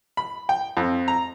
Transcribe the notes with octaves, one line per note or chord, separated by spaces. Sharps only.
B5
G5
F2
A#5